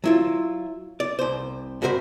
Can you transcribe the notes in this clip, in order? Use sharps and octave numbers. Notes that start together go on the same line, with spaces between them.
F#3 E4 F4
D5
C2 C5
G2 F#4 A#4 C5 D#5 B5